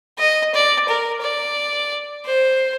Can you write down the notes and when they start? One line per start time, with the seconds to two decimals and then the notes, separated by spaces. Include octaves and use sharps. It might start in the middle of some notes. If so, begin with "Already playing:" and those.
0.19 D#5
0.54 D5
0.88 A#4
1.22 D5
2.26 C5